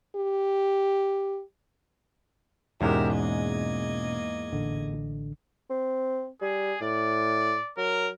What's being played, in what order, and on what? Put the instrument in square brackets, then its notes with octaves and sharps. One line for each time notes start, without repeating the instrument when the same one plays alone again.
[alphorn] G4
[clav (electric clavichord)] E2 G#2 G#3 [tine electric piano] B2 C#4 [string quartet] G4 A#4 E5
[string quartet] A#3 D#5 G#6
[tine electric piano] A1 D3
[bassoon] C4
[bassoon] G3 [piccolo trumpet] G#4
[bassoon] A2 [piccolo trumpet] D5
[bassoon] F#3 [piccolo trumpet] A#4